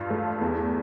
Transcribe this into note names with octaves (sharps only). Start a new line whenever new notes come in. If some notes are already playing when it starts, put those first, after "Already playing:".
Already playing: G2 F4
A3
E2